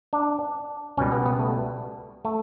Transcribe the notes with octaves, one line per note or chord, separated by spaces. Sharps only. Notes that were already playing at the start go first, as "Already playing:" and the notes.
D4
C#2 B2 G3 C#4
B3
B3
A3
A3